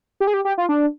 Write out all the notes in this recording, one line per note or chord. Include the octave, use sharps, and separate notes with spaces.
G4
G#4
G4
G4
F4
D4